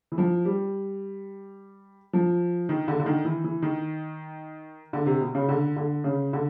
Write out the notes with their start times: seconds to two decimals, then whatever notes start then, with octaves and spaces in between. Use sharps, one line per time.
0.12 E3
0.18 F3
0.45 G3
2.13 F3
2.69 D#3
2.88 D3
3.00 D3
3.06 D#3
3.25 E3
3.44 E3
3.62 D#3
4.93 D3
5.06 C3
5.21 B2
5.35 C#3
5.49 D3
5.76 D3
6.04 C#3
6.33 D3